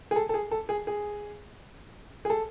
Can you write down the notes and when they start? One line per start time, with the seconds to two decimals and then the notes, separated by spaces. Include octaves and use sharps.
0.11 G#4
0.16 A4
0.29 A4
0.34 G#4
0.51 A4
0.69 G#4
0.87 G#4
2.25 G#4
2.30 A4